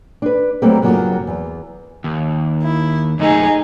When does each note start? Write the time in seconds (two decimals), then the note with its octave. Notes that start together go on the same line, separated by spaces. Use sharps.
0.22 D4 B4
0.62 F#3 G3 A3 A#3 C4
0.82 G2 C#3 F#3 A#3 F4
1.27 E2
2.04 D#2
2.61 E4
3.19 F#2 A3 D#4 G#4